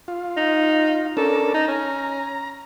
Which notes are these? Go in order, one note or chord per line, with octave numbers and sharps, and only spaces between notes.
F4
D#4
C#4 D4 A4 A#4
D#4 A#5
C#4